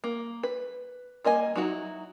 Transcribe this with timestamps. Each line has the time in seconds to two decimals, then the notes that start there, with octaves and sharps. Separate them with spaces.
0.04 A#3
0.43 B4
1.24 G3 A#3 D#5 G#5
1.56 F#3 D#4 E4 F#4